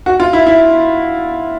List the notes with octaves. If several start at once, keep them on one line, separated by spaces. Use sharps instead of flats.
F#4
F4
E4
E4